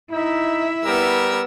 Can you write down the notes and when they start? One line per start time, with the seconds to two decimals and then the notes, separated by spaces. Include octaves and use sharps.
0.11 D#4 E4 E5
0.85 G3 B3 A#4 E6